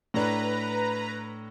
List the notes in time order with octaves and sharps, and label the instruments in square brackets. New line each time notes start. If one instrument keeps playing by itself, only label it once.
[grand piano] A2 D4 [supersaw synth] B4 A#5